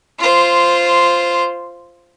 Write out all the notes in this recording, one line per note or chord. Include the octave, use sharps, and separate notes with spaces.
F4 C5